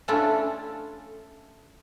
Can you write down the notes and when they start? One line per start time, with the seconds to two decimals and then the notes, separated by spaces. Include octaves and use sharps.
0.08 A3 C#4 D4 E4 F4 A4